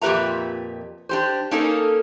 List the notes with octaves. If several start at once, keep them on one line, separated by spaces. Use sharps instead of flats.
F2 A#2 G4 B4 E5 A#5
D4 G4 C5
A#3 C#4 D#4 G#4 A4